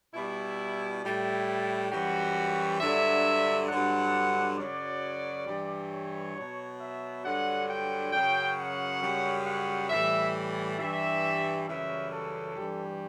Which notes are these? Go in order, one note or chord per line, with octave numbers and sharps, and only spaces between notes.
B2 G3 E4
A2 G3 E4
F#2 E3 G3 F#4
G2 D3 F#3 E5
G2 D3 F#3 F#5
F#2 C#3 F#3 D5
G2 E3 G3
C#5
B2 F#3
E5
G2 D3 F#3 F#5
G5
F#2 C#3 F#3 G5
F#5
F#2 C#3 G3
F#5
A2 E3 G3 E5
G2 E3 G3 E5
F#2 C#3 E3 G3 E5
A4
G2 E3 G3